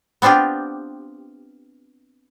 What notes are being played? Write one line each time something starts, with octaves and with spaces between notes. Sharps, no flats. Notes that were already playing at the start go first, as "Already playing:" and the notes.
B3 C4 D4 F4 G4